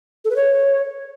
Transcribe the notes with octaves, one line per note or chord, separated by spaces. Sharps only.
A4
B4
C#5